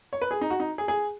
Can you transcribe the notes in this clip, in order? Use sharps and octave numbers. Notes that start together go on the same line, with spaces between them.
C#5
B4
G#4
D#4
F#4
D#4
G#4
G#4